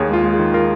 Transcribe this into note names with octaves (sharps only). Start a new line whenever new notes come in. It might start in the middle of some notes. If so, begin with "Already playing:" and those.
Already playing: D#2 G#4 C#5
G#3 F4
G#3
G#4
D#3
F4 A#4